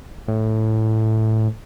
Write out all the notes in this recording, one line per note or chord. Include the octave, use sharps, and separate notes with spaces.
A2